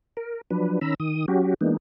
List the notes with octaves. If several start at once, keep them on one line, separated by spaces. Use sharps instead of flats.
A#4
F3 F#3 D4 B4
D#3 C#4 A#5 B5 E6
D#3 D#6
F#3 C#4 F#4 G4
E3 G#3 A#3 B3 D4 D#4